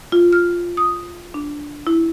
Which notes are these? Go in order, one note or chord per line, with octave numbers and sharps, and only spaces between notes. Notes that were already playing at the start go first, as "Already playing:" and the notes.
F4
F6
D#6
D4
E4